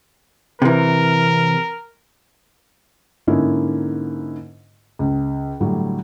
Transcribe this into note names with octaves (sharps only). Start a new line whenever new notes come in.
C3 E3 A#4
G#2 D3 A#3 C#4 D#4 E4
C#2
A2 D3 F#3 G3